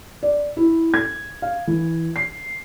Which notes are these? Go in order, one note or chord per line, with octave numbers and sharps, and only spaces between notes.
D5
E4
G#6
F5
E3
C7